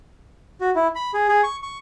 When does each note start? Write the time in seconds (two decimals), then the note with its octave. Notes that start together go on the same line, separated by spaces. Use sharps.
0.61 F#4
0.75 E4
0.95 B5
1.14 G#4
1.28 G#4
1.43 C#6
1.63 C#6